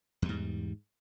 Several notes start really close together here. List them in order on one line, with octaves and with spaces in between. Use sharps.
E2 G3 G#2